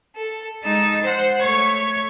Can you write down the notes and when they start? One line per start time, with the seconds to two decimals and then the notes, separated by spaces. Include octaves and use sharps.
0.16 A4
0.63 G#3 D#4 A5 E6
1.03 C5 F#5
1.41 A3 C#5 C#6 G#6